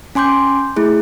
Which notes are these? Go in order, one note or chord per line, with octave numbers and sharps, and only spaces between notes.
C#4 G#5 C6 D6 G6
A3 E4 G#4